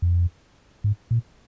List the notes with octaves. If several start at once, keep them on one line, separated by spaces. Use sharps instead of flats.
F2
G#2
A#2